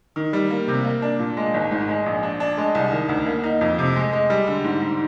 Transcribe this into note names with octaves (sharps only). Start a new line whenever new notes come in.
D#3
G3
A#3
C3
A#3
D4
A#2
G#3
G#1
G#2
G#3
A#1
D4
D4
G#3
C2
D#3
D2
A#3
D#4
F2
C3
G#3
G#3
G3
D3
G#2
G#2